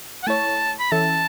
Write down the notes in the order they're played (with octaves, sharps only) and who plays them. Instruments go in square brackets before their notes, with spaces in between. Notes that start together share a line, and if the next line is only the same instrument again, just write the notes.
[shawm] F#5
[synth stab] A3 E4 C#5 [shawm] A5
[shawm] B5
[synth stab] E3 C#4 A4 E5 [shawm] A5